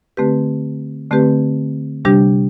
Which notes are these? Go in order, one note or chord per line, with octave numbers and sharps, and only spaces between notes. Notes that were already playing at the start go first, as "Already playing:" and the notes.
D3 A3 C4 G4 B4
D3 A3 C4 G4 B4
C3 G3 D4 G4